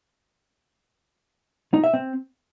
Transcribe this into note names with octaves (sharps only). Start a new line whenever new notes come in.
D#4
E5
C4